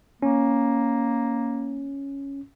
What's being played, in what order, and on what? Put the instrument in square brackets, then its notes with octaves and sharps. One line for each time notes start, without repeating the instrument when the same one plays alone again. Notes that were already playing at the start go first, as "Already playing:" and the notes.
[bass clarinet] A#3 [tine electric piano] C#4